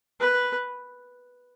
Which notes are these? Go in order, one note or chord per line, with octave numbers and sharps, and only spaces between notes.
B4